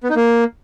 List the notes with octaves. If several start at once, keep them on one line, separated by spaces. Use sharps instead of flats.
B3
D#4
A#3